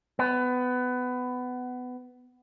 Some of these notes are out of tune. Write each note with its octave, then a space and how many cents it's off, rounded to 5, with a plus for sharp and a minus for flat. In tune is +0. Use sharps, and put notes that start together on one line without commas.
B3 +20